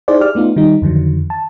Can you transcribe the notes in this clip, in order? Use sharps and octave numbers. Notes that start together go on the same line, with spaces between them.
D#4 E4 G#4 C5 D5
G4 D5 F6
A3 B3 D#4 F4
D#3 G3 D#4
F2 D3 D#3 F#3
A5